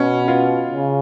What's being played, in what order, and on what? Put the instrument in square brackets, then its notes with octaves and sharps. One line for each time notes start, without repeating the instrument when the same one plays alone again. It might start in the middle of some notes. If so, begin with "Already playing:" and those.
Already playing: [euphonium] B2 [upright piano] C#4
[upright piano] F4
[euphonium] C#3